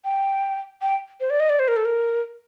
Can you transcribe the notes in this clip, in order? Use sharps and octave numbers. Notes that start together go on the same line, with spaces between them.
G5
G5
C5
D5
D#5
D5
C5
A#4
A4
A#4